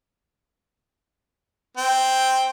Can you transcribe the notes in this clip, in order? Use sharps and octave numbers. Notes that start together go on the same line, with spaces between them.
C4